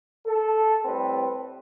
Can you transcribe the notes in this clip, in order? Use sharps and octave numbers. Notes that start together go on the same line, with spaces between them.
A4
A2 G3 C4 B4